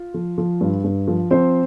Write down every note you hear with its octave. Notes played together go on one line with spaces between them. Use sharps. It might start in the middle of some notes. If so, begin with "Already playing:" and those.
Already playing: F4
F3
F3
G2
G2
F3
F3 C4 C5